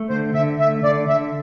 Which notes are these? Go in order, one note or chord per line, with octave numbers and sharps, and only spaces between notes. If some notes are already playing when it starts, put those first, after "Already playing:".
Already playing: A3
D3 C5
D3 E5
A3 E5
D3 D5
D3 E5